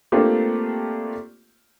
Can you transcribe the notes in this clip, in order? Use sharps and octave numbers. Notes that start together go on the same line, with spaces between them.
A3 A#3 C4 D4 F4 G4